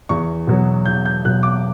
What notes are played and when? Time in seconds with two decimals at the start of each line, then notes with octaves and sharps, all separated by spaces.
0.09 E2 C#6
0.47 B2 F#3
0.86 E2 G6
1.05 G6
1.25 B2 F#3 F#6
1.43 D6